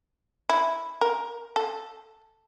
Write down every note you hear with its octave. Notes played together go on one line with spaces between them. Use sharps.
E4
A#4
A4